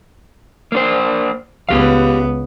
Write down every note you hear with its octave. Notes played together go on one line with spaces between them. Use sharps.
A#3 D4 C5
C#2 B3 G4 F5